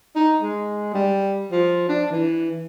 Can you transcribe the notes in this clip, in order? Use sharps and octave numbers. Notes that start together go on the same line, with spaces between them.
D#4
G#3
G3
F3
D4
E3